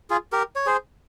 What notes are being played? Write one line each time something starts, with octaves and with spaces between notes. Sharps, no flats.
F4 G#4
G4 A#4
C#5
G#4 C5